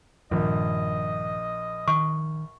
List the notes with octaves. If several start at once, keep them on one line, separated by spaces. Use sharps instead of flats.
A#1 G2 D#3 D#5
D#3 C#6